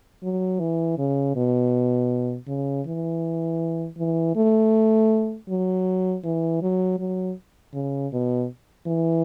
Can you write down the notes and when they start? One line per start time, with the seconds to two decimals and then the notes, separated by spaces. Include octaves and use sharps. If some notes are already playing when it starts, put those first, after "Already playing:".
0.23 F#3
0.60 E3
0.98 C#3
1.36 B2
2.48 C#3
2.86 E3
3.98 E3
4.36 A3
5.49 F#3
6.24 E3
6.62 F#3
6.99 F#3
7.74 C#3
8.13 B2
8.87 E3